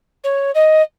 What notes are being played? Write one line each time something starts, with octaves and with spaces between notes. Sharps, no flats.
C#5
D#5